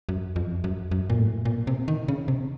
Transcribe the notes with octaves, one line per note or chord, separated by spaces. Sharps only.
F#2
F2
F#2
F#2
A#2
A2
A#2
C3
D#3
C#3
C3